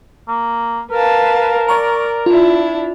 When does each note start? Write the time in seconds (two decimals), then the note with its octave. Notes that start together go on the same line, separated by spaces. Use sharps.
0.28 A#3
0.92 A#4 B4 F5 A5
1.69 D5 A#5 C#6
2.26 D4 E4 F4